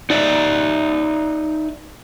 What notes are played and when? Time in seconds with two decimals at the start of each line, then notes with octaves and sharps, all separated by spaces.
0.10 D#4 D5 E5